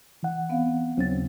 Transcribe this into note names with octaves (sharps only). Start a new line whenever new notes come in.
E3 F#5
B3 C4 F5
D#2 C#3 F#3 C4 C#4 A6